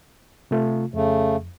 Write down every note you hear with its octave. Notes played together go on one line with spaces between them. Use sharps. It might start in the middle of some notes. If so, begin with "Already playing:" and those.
C3 A3 F4
F2 C#3 A3